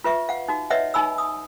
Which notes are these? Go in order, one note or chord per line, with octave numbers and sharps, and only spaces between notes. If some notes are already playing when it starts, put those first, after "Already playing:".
F4 B4 E5 C#6
F5 F#5
D#4 F#4
B4 C#5 D#5 E5 F#5
D#4 G#5 B5 E6
D#6